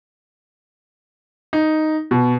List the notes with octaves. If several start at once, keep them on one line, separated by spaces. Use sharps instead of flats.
D#4
B2